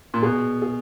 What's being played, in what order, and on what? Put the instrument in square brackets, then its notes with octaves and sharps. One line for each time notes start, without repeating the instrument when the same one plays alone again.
[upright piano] A#2
[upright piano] B2 [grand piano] G#4
[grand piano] G#4